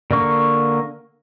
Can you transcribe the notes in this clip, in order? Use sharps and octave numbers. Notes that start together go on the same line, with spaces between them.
D3 A#3 C#6